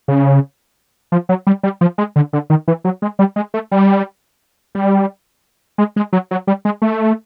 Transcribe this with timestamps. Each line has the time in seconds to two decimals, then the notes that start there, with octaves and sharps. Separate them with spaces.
0.08 C#3
1.12 F3
1.29 F#3
1.47 G3
1.63 G3
1.81 F3
1.98 G#3
2.16 D3
2.33 D3
2.50 D#3
2.68 E3
2.85 F#3
3.02 G#3
3.19 G3
3.36 G#3
3.54 A3
3.72 G3
4.75 G3
5.78 G#3
5.96 G#3
6.13 F#3
6.31 F#3
6.47 G3
6.65 G#3
6.82 A3